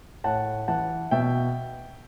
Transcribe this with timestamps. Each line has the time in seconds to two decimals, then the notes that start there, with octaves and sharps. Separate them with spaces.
0.24 A2 F#5 A5
0.68 E3 F#5 A5
1.11 B2 E5 G5